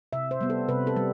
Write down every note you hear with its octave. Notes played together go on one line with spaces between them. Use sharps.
C3 E5
C5
G3 B3
A4
C3 B4
A4
G3